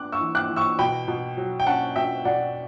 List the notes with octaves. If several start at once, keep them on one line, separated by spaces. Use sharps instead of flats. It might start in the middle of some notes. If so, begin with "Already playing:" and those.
Already playing: B3 D4 D6 F#6
C#6 E6
E3
D6 F#6
E3
C#6 E6
B2 G5 B5
B2
F#3
G5
C#4 F#5 A5
B2 E5 G5
B2 D5 F#5